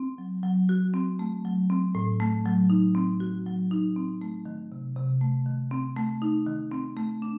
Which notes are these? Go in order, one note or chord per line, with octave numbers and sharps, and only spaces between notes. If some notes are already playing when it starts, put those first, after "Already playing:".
Already playing: C4
F#3
F#3
F#4
C4
A3
F#3
C4
A2
A3
F#3
D#4
C4
F#4
F#3
D#4
C4
A3
D#3
C3
C3
A3
D#3
C4
A3
D#4
D#3
C4
A3
D4